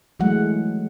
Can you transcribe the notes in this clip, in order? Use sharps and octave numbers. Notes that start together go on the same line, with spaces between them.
E3 F#3 G#3 A3 F#5